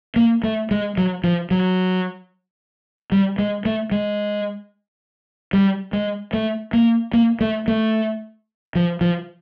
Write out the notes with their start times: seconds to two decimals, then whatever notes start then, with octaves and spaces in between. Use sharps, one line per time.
0.16 A#3
0.44 A3
0.71 G#3
0.98 F#3
1.24 F3
1.51 F#3
3.12 G3
3.38 G#3
3.65 A3
3.92 G#3
5.53 G3
5.93 G#3
6.33 A3
6.73 A#3
7.13 A#3
7.41 A3
7.68 A3
8.75 F3
9.01 F3